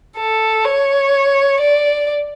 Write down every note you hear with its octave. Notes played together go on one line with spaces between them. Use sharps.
A4
C#5
D5